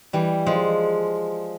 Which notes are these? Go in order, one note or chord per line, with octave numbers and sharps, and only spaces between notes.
E3 G3
F3 G#3